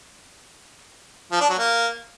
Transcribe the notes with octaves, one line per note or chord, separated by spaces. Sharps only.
F3
D4
F#3
A#3